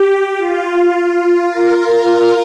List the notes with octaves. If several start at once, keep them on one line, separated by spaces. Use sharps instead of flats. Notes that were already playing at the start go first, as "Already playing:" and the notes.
Already playing: G4
F4
F4
A#4